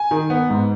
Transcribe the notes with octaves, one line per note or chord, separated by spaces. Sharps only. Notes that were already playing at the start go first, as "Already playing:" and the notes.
Already playing: G#5
D#3
B3
G#2